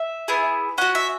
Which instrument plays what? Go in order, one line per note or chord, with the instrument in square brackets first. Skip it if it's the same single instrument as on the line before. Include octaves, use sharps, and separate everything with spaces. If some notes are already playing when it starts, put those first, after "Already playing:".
Already playing: [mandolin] E5
B3 E4 G#4
C#4 F#4 F#5
E5